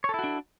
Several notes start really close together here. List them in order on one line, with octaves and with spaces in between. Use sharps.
C#5 A4 E4 F#4 D4